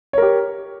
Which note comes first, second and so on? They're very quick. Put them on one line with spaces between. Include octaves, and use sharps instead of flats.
C#5 A#4 G4